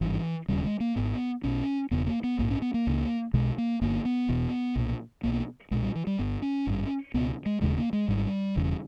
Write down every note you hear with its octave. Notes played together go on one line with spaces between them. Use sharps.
G#1 G2 E3
E1 D#2 C#3 G3
G#3
A#3
G#1 G#2 B3
B1 B2 C#4
E1 E2 C#3 B3
A#3
B3
A#1 G#2 A#3
C#4
B3
A#3
C#2 C#3
B1 B2 G#3
A#3
G1 G2 A#3
B3
E1 E2 B2
B1 A#2
B1 B2 A#3
B1 A#2 G#3
G3
E3
G3
G1 G2 B3
C#4
G#1 G2
C#2 B2 B3
G#3
E1 D#2 C#3 G#3
A#3
G#3
G#1 G#2 G3
E1 E2 C#3